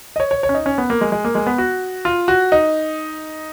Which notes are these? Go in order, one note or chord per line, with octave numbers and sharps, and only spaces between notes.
D#5
C#5
C#5
C#5
C#4
D#4
C#4
B3
A#3
G#3
G#3
A#3
G#3
B3
F#4
F4
F#4
D#4